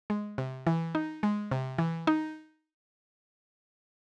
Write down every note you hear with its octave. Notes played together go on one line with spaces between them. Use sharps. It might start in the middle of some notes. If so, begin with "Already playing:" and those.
G#3
C3
E3
D#4
G#3
C3
E3
D#4